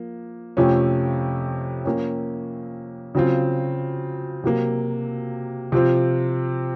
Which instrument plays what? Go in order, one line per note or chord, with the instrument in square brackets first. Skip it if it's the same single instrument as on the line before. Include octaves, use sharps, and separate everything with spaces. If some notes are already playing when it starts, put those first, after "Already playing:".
Already playing: [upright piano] F3 A#3
F2 C3 F3 A3 C#4
F3 A#3 C#4
C#3 F#3 C4 F4
C3 F#3 A#3
C3 F3 C4 F4